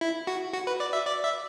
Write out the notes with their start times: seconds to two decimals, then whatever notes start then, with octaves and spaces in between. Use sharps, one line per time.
0.01 E4
0.27 F#4
0.54 F#4
0.67 B4
0.80 D5
0.93 E5
1.07 D5
1.24 E5